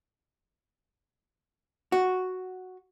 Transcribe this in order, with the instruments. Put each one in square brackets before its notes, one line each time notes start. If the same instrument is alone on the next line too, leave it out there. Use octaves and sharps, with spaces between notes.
[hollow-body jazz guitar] F#4